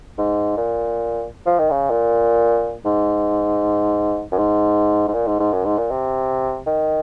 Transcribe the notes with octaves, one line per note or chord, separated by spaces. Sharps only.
G#2
A#2
F3
D#3
C#3
A#2
G#2
F#2
G#2
G#2
A#2
G#2
G#2
F#2
G#2
A#2
C3
D#3